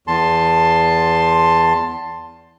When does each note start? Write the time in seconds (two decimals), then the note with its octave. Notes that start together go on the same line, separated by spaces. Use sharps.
0.07 E2 A5 C6